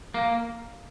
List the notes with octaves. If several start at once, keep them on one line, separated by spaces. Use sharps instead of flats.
A#3